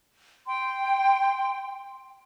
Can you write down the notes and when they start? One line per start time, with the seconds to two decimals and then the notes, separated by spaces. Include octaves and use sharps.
0.47 G5 C6